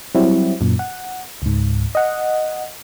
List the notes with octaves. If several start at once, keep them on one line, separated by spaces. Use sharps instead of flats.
F#3 G3 C4 E4 F#4
F#2 A#2
F#5
C#2 G#2
D#5 F#5